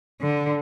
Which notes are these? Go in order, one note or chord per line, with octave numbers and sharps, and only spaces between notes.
D3